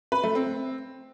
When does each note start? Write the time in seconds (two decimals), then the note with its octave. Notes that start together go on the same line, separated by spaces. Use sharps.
0.12 B4
0.24 A3
0.35 C4